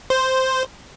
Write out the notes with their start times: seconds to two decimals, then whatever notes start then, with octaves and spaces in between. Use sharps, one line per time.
0.10 C5